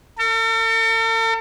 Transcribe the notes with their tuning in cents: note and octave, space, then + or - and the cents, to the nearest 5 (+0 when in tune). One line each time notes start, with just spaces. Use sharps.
A4 +45